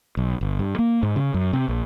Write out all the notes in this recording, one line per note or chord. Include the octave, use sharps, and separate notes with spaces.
B1
G1
G2
A#3
G#2
C#3
F#2
C3
A#1